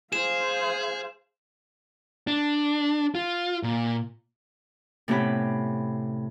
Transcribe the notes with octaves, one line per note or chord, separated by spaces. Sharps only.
G#4 C5 F5 E7
D4
F4
A#2
A2 C3 B3 C#4 G4 B5